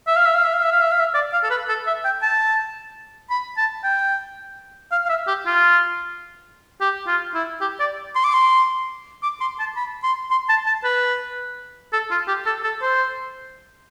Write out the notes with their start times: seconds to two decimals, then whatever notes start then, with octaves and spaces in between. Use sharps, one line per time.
0.07 E5
0.16 F5
0.25 E5
0.34 F5
0.44 E5
0.53 F5
0.62 E5
0.72 F5
0.81 E5
0.91 F5
0.99 E5
1.14 D5
1.33 F5
1.43 A4
1.50 B4
1.68 A4
1.87 E5
2.05 G5
2.22 A5
3.30 B5
3.57 A5
3.84 G5
4.91 F5
5.06 F5
5.09 E5
5.28 G4
5.46 F4
6.80 G4
7.07 F4
7.34 E4
7.61 G4
7.80 D5
8.15 C6
8.24 D6
8.34 C6
9.23 D6
9.41 C6
9.59 A5
9.76 B5
10.04 C6
10.31 C6
10.49 A5
10.67 A5
10.84 B4
11.93 A4
12.11 F4
12.28 G4
12.46 A4
12.63 A4
12.82 C5